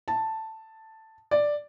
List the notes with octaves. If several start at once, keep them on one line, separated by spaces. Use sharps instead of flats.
A5
D5